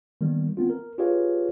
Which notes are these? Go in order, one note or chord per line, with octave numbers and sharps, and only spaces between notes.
D#3 G3 A#3 B3
B3 C4 F4
A#4
F4 G4 G#4 B4 C#5 F5